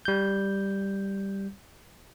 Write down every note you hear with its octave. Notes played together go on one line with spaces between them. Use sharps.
G3 G6